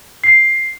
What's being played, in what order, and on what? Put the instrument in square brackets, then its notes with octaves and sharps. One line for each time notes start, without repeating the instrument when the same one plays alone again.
[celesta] C7